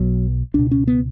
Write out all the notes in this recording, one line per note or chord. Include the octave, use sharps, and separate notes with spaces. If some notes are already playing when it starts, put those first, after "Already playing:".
Already playing: B1 B2 F#3
C#2 B2 D4
C#4
B3